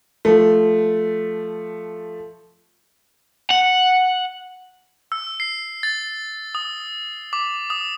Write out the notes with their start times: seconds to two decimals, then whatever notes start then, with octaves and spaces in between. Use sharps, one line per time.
0.25 F3 A3
3.50 F#5
5.12 E6
5.40 C7
5.83 A6
6.55 D#6
7.33 D6
7.70 D#6